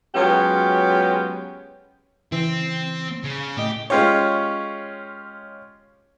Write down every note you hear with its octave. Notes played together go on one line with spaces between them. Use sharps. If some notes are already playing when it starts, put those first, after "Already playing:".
F#3 G#3 B3 C#4 F4 G4
C#3 E3 C4
C#3
A2 A3 G4 D#5
G#3 C#4 F4 G4 C#5